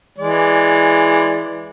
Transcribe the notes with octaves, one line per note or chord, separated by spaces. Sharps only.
E3 G#3 D5